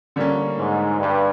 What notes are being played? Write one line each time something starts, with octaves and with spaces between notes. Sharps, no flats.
D3 G3 A#3 C#4
G#2
G2